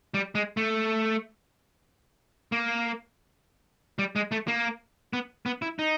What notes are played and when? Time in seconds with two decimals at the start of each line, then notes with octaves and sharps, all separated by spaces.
0.14 G3
0.35 G#3
0.57 A3
2.52 A#3
3.99 G3
4.16 G#3
4.32 A3
4.48 A#3
5.13 B3
5.46 B3
5.62 E4
5.79 D#4